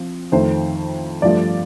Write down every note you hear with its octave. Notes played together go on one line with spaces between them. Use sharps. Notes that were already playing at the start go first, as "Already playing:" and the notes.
Already playing: F3 C4
F2 D#3 A3 C5
G2 F3 A3 D5